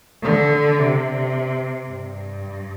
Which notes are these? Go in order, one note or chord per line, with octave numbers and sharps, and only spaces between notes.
D3
C3
G2